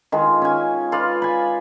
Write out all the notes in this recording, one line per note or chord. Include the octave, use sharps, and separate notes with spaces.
D#3 G#3 F4
C#4 G#5
F4 B4 D5 F5
G#5 B5